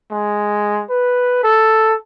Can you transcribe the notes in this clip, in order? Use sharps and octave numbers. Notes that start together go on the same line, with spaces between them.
G#3
B4
A4